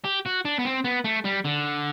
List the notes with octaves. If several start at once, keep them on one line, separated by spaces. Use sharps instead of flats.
G4
F#4
D4
B3
C4
B3
A3
G3
D3